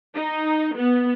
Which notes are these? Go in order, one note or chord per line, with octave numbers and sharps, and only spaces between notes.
D#4
B3